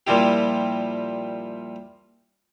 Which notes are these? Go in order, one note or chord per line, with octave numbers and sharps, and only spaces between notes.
A#2 F3 G3 E4 G4